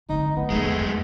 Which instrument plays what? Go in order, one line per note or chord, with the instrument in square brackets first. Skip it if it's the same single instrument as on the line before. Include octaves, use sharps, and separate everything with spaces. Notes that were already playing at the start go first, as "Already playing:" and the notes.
[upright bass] D3 C4 [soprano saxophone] D#4
[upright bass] A3 [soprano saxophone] B3
[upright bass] E2 F3 [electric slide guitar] G#3 A3
[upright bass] F2